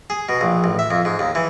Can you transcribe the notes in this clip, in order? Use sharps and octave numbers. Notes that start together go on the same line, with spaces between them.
G#4
B2
A#1
A1
E5
F2
G#2
D#2
E3